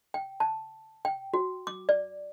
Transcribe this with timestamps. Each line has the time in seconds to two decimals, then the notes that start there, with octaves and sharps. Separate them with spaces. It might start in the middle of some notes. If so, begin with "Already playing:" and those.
0.14 G5
0.40 A5
1.05 G5
1.34 F#4
1.67 D6
1.89 D5